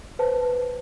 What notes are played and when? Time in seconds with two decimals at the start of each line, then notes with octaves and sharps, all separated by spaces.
0.19 B4 C5 A5